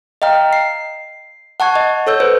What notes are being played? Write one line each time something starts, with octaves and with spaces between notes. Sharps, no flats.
D#5 F5 G5 A#5 F6
C7
F#5 A5 C#6 G#6
D#5
A4 C#5 E6 G6
A4 B4 C5